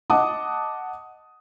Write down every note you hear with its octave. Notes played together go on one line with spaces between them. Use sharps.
D#5 F#5 A5 D6 D#6